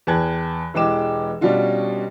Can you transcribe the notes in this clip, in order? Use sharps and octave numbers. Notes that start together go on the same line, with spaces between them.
E2 B4 G5 A5 F#6 G#6
E1 E3 G#3 G4 D6 E7
B2 G3 C#4 D4 F4 F#4